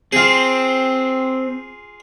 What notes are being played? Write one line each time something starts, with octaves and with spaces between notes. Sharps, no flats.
C4 F4 G#4